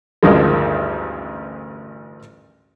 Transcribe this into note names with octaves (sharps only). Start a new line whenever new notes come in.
A1 D2 G2 D#3 F3 G#3